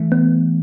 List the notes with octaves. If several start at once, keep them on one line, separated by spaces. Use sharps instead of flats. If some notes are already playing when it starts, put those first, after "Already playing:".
Already playing: E3 A3
B3